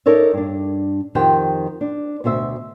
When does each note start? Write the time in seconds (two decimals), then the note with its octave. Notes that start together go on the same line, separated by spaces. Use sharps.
0.06 D#4 A4 A#4 C#5 D5 E5
0.33 G2 D4
1.15 F2 D#3 G4 C5 F#5 G5
1.81 D4
2.24 D2 B2 C5 E5